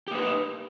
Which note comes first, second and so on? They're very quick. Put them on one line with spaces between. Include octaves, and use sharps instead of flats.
G4 A#3 B4 D#4